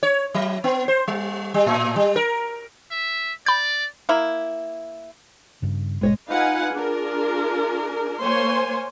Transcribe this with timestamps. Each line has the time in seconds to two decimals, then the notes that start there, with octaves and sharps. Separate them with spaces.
0.03 C#5
0.34 F#3
0.64 B3
0.88 C5
1.08 G3
1.54 G3
1.66 A2
1.96 G3
2.16 A#4
2.91 E5
3.46 D5 B5 G6
4.09 A#3 E4
5.62 G2 C#3
6.01 G1 A#2 G#3 C#5 D#5
6.30 D#4 F4 B4 F5 F#5 G#5
6.72 D4 F4 G#4 A#4
8.22 A#3 C5 C#5 G#5 C6